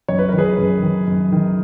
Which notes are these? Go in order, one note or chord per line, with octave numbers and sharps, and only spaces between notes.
F#2 C#5
B4
D#3 A#4
G#4 B4
F#2
D#3
F#2
D#3